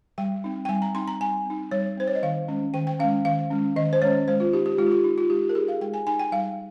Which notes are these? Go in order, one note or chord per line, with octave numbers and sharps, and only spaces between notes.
G3 G5
C4 D#4
G5
G3 G#5
A#5
C4 D#4 C6
A#5
G3 G#5
C4 D#4
G3 C#5
C4 D#4 C5
C#5
D#5
D#3 F5
G#3 C#4
D#3 G5
G5
G#3 C#4 F5
D#3 F5
G#3 C#4
D#3 D#5
C5
G#3 C#4 C#5
G#3 C5
F4
D#4 G4
G4
G#3 F4
G4
F4
D#4
F4
G#3 G4
G4
A#4
D#4 G#4
F5
G#3 G5
G#5
D#4 G#5
G5
G3 F5